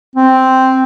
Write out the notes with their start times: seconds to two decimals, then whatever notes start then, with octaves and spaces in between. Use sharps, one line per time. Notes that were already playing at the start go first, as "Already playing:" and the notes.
0.16 C4